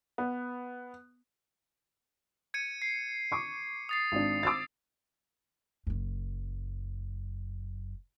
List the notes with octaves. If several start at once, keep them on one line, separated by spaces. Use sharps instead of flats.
B3
G#6 C#7 D#7
C7
C#6 D6
D#6 A6 C7
G#1 D4
D6 E6 A6
F#1 F#2